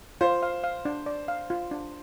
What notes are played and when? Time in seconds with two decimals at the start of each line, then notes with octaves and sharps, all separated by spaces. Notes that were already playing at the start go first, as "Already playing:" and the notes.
0.21 F4 C5
0.43 F5
0.64 F5
0.85 D4
1.06 D5
1.28 F5
1.50 F4
1.71 D4